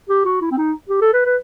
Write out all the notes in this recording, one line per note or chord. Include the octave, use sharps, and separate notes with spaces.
G4
F#4
E4
C4
D#4
G4
A4
B4
B4